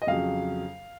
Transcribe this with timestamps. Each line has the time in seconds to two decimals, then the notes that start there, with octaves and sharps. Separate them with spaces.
0.02 D#5
0.07 F2 C#3 F#3 F5